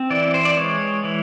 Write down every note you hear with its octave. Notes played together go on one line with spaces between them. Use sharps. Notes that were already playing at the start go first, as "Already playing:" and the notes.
Already playing: C4
E3 D5
C5
D5
G#3 C#5
E3